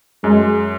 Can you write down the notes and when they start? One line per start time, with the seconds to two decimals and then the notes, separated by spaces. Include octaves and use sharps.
0.24 F#2 G#3